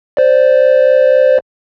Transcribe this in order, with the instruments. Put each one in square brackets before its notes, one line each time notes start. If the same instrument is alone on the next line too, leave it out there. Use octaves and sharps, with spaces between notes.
[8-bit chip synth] C5 D5